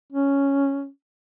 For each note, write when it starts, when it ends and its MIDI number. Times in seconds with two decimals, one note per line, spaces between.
0.12 0.88 61